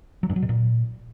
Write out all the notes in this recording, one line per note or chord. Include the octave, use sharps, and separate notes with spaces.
F#3
G2
F#3
B2
A#2